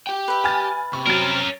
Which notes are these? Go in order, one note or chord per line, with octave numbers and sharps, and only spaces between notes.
G4 G5
B4 E5
G#5 F6 A6
C3 C#6
F#3 C#4 A#4 A6